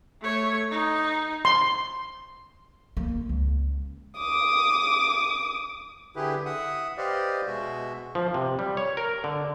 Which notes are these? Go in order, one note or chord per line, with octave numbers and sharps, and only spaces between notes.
A3 C#5
D#4
C6
A#3
C#2
D6 D#6
D3 E4 G4 G#4 B4
E5 F#5 D#6
G4 B4 C5 D5 D#5 F5
B2 G#3 F#4 E5
F3
C3
G3
C#5
A#4
D3